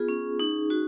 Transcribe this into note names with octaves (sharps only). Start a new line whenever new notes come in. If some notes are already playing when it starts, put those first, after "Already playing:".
Already playing: B3 F4 G#4
C#4
D#4
F#4